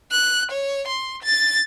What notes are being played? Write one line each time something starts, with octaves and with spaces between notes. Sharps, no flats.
F#6
C#5
C6
A6